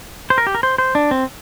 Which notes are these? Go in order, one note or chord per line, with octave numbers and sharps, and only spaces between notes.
C5
A#4
G4
A#4
C5
C5
D4
C4